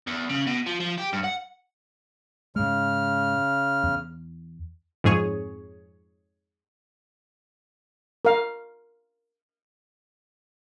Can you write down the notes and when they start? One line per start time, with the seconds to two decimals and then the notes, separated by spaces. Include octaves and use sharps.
0.07 E2
0.30 C#3
0.47 B2
0.66 F3
0.80 F3
0.98 G4
1.13 G2
1.24 F#5
2.56 G#2 C#3 G#3 F6
3.83 E2
5.04 F2 G#2 G#4 C#5
8.25 A#4 F5